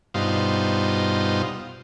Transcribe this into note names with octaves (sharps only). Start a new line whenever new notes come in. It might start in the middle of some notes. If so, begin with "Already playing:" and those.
G2 B2 D#4 F4 C5